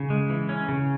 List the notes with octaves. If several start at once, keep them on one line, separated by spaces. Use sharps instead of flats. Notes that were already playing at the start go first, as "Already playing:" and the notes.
Already playing: C#3
G#3
E3
C#4
C#3